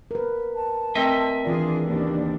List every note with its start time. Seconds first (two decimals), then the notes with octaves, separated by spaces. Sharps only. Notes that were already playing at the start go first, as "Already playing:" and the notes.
0.11 A#4 B4
0.55 A5
0.95 A3 C4 A#4 D#5 E5
1.45 D#3 E3 D4 F4 G#4 D5
1.87 D#2 C#3 D4 G4